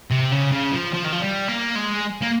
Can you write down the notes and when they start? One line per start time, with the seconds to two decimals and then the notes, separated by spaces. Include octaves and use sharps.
0.11 C3
0.32 C#3
0.52 C#3
0.72 F3
0.94 F3
1.05 D#3
1.13 F3
1.20 G3
1.48 A#3
1.75 G#3
2.22 A#3